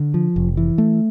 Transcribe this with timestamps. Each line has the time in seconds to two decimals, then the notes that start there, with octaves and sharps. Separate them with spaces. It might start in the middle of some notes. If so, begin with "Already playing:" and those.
Already playing: D3
0.14 F3
0.36 F1
0.57 E3
0.78 A3